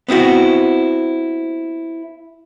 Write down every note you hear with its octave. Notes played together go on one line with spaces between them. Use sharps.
B3 C4 E4 F#4